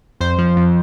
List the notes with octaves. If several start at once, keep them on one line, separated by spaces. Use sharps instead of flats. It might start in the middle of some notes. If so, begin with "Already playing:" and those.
F2 C5
F3
F2